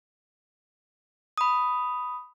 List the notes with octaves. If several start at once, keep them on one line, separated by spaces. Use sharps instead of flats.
B5 D#6